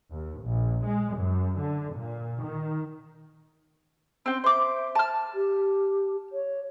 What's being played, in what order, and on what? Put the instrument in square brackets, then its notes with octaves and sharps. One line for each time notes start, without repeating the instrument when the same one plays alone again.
[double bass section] D#2
A#1
G#3
F#2
D3
A#2
D#3
[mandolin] C4 G5 [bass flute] C#4
[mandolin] C5 D6 [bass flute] E5
[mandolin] A5 F6
[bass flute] G4
C#5